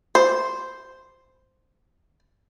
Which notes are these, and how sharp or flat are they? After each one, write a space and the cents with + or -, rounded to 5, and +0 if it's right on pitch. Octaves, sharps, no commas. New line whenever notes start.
C5 -5